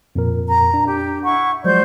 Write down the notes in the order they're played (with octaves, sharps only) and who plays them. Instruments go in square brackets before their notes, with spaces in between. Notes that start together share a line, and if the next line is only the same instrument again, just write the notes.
[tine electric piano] F2 A#2 A#4
[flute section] A#5
[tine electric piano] D4
[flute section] G4
E4 F#5 C#6
[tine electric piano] F3 F#3 G#3 [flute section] C5 D5 G6